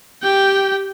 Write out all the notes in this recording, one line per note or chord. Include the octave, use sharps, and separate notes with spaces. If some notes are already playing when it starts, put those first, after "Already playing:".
G4 G5